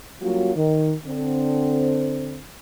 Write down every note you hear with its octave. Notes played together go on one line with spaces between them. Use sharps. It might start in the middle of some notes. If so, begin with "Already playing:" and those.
F#3 G3 A#3 C#4 F4 F#4
D#3
D3 C4